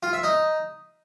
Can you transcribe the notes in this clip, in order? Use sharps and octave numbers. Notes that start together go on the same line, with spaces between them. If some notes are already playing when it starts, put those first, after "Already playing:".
F4
E5
D#4